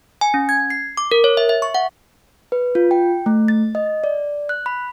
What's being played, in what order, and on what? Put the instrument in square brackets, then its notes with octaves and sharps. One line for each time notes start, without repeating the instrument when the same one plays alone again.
[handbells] G#5
C#4
G#6
C7
D6
A#4
C#5
E5
E5
C#6
F#5
[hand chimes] B4
F4
G5
A3
A6
D#5
D5
F#6
B5